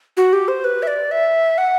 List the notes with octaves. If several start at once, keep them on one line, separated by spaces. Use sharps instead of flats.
F#4
G4
C5
B4
E5
D5
E5
F#5